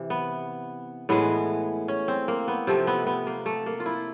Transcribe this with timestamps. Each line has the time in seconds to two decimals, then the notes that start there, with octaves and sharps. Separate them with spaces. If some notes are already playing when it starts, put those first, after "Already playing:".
Already playing: C3 E3
0.10 B3
1.09 A2 E3 G#3 B3
1.88 C#4
2.08 C4
2.28 A#3
2.48 B3
2.67 C3 F3 A3 C4
2.87 B3
3.07 B3
3.27 A#3
3.46 A3
3.66 A#3
3.80 F4
3.86 E4